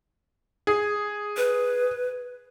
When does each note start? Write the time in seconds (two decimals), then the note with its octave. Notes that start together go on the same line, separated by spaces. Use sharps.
0.67 G#4
1.37 B4